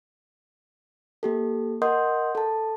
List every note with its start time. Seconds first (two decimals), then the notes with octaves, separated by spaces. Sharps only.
1.23 A#3 G4 A4
1.82 A#4 D#5 F#5 C6 D#6 G6
2.35 A4 A5